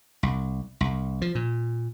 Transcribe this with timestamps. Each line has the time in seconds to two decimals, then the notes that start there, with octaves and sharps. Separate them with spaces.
0.23 C2
0.81 C2
1.22 F3
1.35 A#2